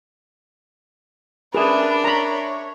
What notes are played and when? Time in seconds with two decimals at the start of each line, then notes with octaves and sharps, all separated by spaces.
1.55 D4 G#4 A#4 B4 E5
2.04 C#5 A#5 B5